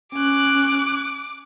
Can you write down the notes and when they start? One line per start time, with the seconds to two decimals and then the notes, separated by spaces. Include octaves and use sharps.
0.13 C#4 D6 F#6